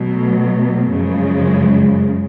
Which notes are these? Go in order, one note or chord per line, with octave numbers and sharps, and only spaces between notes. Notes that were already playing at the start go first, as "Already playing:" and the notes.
Already playing: B2 F#3 A3
F#2 C#3 F3 G#3